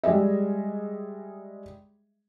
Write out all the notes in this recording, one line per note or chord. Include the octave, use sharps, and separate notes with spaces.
G3 G#3 G#4 D#5 E5